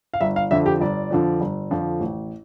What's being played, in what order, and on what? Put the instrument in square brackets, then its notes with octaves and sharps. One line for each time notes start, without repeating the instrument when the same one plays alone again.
[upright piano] F5
G1 E5
F5
F2 D3 F3 E5
G4
G1 D5
F2 D3 F3
G1
F2 D3 F3
A1